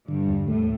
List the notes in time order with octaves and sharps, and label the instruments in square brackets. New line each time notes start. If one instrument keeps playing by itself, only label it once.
[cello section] G2 [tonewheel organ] D3
[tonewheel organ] E2
[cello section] A2 [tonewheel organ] A3